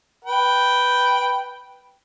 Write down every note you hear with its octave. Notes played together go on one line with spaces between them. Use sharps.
B4 G5